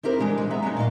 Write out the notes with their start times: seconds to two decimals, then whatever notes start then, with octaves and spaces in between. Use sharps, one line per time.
0.03 C4 E4 G4 A#4 C5
0.20 D3 E3 G3 G#3 D4
0.38 G3 G#3
0.50 B3 E5 A#5
0.63 F#3 G#3 A3 C#4 D#4
0.76 A#2 D5 D#5 F5